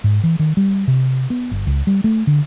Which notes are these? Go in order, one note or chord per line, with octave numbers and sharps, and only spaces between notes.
G#2
E3
D#3
G3
C3
B3
G1
C#2
G3
A3
D3